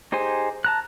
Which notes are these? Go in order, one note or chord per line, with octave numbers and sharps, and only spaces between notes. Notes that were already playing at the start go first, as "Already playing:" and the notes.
D#4 G4 G#4 C5 G#5
A5 A#5 F#6